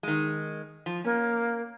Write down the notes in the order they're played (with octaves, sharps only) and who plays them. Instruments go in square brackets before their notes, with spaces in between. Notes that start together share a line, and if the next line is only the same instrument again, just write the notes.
[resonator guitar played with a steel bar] D#3 G#3
F3
[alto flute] A#3 [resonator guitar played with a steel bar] C#4